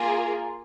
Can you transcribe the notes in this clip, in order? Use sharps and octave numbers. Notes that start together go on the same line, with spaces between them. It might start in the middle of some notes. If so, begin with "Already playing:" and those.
Already playing: A#3 F4 G#4